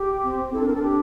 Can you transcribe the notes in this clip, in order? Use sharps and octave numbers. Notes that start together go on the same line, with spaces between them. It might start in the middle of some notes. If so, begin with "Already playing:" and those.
Already playing: G4
C4
E4 A4
D4
A#4
C4
A4
D4
G4